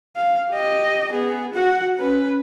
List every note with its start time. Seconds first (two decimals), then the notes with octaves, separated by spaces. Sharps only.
0.16 F5
0.50 G4 D#5
1.11 B3 G#4
1.53 F#4 F#5
1.96 C#4 B4